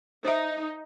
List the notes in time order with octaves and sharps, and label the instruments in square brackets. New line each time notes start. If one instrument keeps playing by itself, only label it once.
[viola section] D#4 [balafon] C5 E5